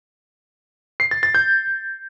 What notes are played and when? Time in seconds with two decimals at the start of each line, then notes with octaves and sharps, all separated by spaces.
1.00 C7
1.11 A6
1.23 A6
1.35 G6